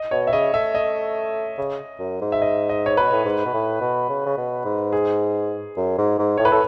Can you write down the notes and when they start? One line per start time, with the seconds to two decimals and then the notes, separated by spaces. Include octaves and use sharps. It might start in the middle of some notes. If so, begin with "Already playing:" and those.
Already playing: D#5
0.11 B2 C#5
0.27 E5
0.33 C#3 D#5
0.54 A3 E5
0.75 A3 D#5
1.58 C#3
1.99 F#2
2.21 G#2
2.32 E5
2.42 D#5
2.69 D#5
2.86 C#5
2.97 B2 B4
3.12 A2
3.25 G#2
3.46 B2
3.53 A2
3.81 B2
4.09 C#3
4.26 C#3
4.37 B2
4.65 G#2
4.93 G#4
5.76 F#2
5.98 G#2
6.19 G#2
6.38 A2 C#5
6.45 B4
6.52 A2 A4